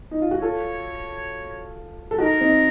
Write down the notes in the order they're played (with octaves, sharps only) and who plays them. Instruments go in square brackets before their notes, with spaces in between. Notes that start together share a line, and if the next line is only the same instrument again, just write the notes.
[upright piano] D#4
F4
F#4
[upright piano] F4 A4 [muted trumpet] C#5
[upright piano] A4
[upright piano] D#4 F#4 [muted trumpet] A#4
[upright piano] C4 D#4